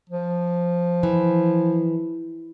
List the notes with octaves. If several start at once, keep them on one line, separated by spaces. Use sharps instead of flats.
F3
E3